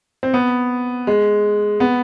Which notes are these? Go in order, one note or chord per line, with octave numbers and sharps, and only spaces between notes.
C4
B3
G#3
B3